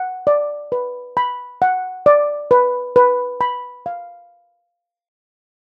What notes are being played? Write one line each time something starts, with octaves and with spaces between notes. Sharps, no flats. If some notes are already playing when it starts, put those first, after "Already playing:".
Already playing: F#5
D5
B4
B5
F#5
D5
B4
B4
B5
F5